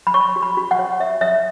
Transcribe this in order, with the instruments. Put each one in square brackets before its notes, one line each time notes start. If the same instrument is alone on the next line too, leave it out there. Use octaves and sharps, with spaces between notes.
[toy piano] B5
C#5 C#6
F#4
B5
F#4
F#5
C#5
C#5 E5
C#5 E5